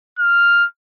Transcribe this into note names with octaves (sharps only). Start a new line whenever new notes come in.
F6